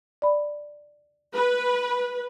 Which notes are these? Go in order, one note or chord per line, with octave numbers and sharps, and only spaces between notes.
D5 B5
B4